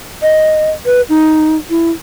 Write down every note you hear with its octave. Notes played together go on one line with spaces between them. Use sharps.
D#5
B4
D#4
E4